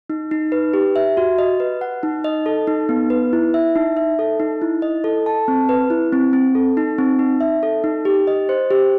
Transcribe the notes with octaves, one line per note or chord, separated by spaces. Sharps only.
D#4
D#4
B4
G4
E5
F#4
D#5
B4
F#5
D#4
D#5
A4
D#4
B3
B4
E4
E5
D#4
E5
A4
D#4
E4
D#5
A4
A5
C4
B4
E4
C4
C4
A4
D#4
C4
D#4
E5
A4
D#4
G4
D#5
C5
G4